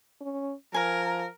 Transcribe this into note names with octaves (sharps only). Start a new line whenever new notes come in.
C#4
F3 A#4 G#5 A#5